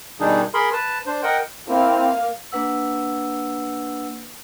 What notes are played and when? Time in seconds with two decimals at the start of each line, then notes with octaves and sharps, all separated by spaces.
0.20 B2 D#3 G3 D4 D#4 G#4
0.54 G#4 A#4 B5 C6
0.73 B4 A5
1.06 D4 C5
1.23 A#4 D#5 F#5 G5
1.68 A#3 C4 E4 F5
2.52 A#3 D4 B4 F#5 E6